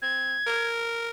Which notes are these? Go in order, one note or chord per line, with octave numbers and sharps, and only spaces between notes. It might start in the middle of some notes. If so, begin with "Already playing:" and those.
C4 G#6
A#4